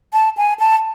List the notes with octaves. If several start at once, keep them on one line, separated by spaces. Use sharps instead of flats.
A5
G#5
A5